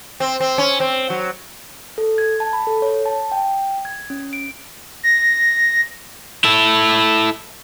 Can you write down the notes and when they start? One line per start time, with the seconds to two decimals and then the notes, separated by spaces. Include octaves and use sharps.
0.20 C4
0.40 C4
0.58 C#4
0.80 C4
1.10 F#3
1.98 A4
2.18 G#6
2.40 A5
2.53 B5
2.67 A4
2.82 C#5
3.05 A5
3.32 G5
3.85 G#6
4.10 C#4
4.33 D7
5.03 A#6
6.44 E4 A4